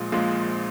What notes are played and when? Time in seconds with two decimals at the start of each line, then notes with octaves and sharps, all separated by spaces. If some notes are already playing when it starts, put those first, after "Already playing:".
Already playing: A#1 A#2 G#3 F4
0.12 A#1 A#2 G#3 F4